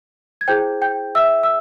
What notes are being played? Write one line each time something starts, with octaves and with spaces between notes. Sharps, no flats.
G#6
E4 G#4 C5 G5 G6
G5 G6
E5 E6
E6